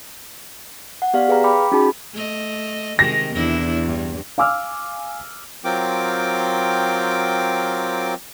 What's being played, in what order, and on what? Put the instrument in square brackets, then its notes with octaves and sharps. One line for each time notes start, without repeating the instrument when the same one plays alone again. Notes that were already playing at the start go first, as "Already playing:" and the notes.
[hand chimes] F#5
B3 G4 D5 F5
G#4 B4 F5 G5 A#5
G5 B5 D6
C#4 D#4 F#4 G#4 A5 B5
[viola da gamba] A3 D#5
[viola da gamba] C3 D#3 G#3 [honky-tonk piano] A#6
[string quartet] E2 [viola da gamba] D4 E4
[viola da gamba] G2
[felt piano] F5 G#5 D6 E6 F6
[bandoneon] F#3 C4 F4 A#4 G5 D6